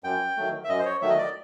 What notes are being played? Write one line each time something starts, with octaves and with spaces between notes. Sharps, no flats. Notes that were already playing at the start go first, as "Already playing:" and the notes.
F#2 G5
D#3 F#3 A3
E5
F#2 D#5
C5
C#5
D#3 F#3 A3 E5
D#5
D5